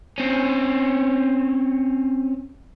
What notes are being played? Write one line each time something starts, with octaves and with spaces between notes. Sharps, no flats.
C4 C#4